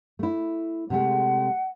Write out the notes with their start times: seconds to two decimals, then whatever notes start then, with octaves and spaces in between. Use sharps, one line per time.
0.19 A3 E4
0.90 C3 G#3 A3 F#5